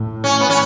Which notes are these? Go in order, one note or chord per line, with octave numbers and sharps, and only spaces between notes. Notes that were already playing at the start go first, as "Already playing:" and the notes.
Already playing: A2
C#4
B3
C#4